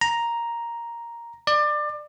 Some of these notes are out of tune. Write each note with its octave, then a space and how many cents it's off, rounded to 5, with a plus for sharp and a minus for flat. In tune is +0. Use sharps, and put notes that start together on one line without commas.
A#5 +5
D5 +25